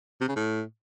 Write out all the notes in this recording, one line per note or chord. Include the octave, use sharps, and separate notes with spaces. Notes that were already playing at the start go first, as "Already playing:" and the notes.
C3
C#3
A2